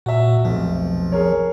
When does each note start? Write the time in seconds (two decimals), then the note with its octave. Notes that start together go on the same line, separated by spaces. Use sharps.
0.06 A#2 F#4 E5
0.45 F1 B1 F3
1.12 G#4 A#4 C#5